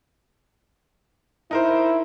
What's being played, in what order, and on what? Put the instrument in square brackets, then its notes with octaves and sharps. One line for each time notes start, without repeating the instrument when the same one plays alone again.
[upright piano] D#4 A#4 C5 [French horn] E4